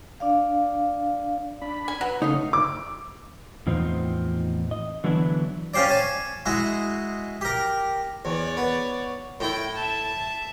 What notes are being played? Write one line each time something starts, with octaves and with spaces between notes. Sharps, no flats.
D4 D5 F5
D4 B5
G#5
F#3 B4
C#3 A3 D#4 C#5 F5
D6
E2 A2 F3 C4 D#4
D#5
D3 E3 F#3 B3 D4 E4
C#4 F4 G4 C5 D5
G#5 A5 C#6
G#3 E4 F#4
G4 A#4
E2 C#5 D5
B3
A2 E4 G5
E5 A5